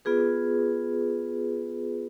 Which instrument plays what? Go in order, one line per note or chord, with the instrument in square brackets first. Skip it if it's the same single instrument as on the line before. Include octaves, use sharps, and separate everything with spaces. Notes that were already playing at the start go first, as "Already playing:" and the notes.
[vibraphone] B3 F4 G#4 B4